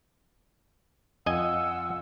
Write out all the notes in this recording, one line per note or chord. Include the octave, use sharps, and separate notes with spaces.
F2 F4 D#5 F#5 G#5 E6